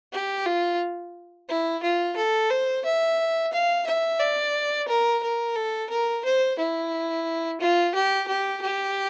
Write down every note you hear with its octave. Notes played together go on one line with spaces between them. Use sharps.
G4
F4
E4
F4
A4
C5
E5
F5
E5
D5
A#4
A#4
A4
A#4
C5
E4
F4
G4
G4
G4